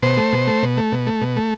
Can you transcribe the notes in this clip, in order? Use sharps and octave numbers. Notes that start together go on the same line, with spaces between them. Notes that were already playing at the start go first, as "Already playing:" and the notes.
B2 C5
A3
B2
A3
B2
A3
B2
A3
B2
A3